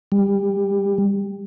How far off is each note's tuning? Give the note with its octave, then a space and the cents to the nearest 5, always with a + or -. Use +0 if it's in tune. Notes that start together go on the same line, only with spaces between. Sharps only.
G3 +20